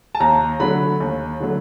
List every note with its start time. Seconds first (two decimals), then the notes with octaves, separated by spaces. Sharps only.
0.15 A5
0.20 D#2 A#5
0.60 D3 F#3 A3 B5
1.00 D#2
1.40 D3 F#3 A3